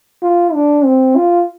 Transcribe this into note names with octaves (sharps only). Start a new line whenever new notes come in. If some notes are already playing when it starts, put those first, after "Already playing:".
F4
D4
C4
F4